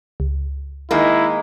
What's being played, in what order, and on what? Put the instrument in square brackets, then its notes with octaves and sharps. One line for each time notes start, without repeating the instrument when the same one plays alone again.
[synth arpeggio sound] C#2
[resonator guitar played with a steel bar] D#3 G#3 A#3 [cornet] E4